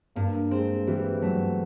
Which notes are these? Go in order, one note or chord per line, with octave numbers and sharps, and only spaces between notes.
G2 A#3
G#3 C4
E3 G3
F#3 A3